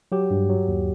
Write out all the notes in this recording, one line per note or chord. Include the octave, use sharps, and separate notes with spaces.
F#3 G4
G2
F#3
D#2